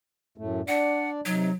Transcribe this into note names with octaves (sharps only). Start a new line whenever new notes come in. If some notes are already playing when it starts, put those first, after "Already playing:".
F#2 A2 A3
D4 D5 F#5
C3 F#3 D#4